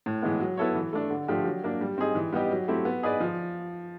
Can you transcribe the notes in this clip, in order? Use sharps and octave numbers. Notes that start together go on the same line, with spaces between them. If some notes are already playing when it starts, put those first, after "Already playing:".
A2
E3 G#3 B3
F#3
B3 E4 A4 C#5
E3
A3 D4
D3
F3 A3 D4 G4
F#3
A#3 D4
G3
C4 D#4 G#4
E3
G3 B3 D#4 G4
F#3
A3 C4 E4 G4
B3
D#4 G#4 B4 D5
F3